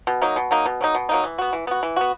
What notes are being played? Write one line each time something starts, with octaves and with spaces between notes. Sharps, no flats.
B2
F#3 A#3 D#4
B2
F#3 A#3 D#4
B2
F#3 A#3 D#4
B2
F#3 A#3 D#4
E3
B3 F#4
E3
B3 F#4
E3
B3 F#4